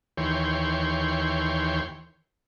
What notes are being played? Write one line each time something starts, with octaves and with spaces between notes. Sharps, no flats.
D#2 E3 C#5 G5 C6